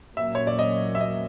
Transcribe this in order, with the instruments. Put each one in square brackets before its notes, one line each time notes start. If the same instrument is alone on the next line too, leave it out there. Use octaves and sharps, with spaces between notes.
[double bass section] A#2 F#3 A#3 C#4 [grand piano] E5
[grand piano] C#5
D5
D#5
E5
D#5